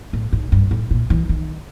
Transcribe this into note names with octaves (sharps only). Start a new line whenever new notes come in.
A2
G#2
G2
A2
A#2
E3
D#3